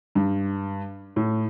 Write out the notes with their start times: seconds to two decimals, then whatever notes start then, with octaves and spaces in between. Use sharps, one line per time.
0.15 G2
1.16 A2